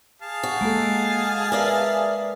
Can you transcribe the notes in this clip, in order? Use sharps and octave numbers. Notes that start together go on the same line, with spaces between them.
G#4 F5 A5
F#4
G#3 A#3 A4
A#4 B4 D5 E5 D#6